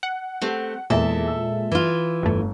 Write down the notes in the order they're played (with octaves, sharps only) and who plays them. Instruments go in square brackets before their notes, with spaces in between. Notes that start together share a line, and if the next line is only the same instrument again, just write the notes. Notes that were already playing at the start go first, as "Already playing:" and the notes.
[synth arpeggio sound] F#5
[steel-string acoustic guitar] A3 C4 G4
[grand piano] E2 [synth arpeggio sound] A#2 G#3 [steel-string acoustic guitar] A4 E5
[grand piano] E6
[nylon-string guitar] E3 F4
[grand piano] G1 [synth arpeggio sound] G2 A3